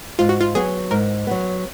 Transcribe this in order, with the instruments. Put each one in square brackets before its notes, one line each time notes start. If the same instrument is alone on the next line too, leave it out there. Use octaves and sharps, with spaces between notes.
[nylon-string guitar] G#2 [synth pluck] F4
[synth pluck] F#4
F4
[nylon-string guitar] F#3 B3 [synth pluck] G#4
[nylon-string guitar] G#2 [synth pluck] A#4
[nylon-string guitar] F#3 B3